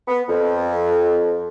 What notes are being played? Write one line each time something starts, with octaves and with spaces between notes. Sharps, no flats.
B3
F2